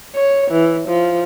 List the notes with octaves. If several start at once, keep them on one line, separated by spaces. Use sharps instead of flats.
C#5
E3
F3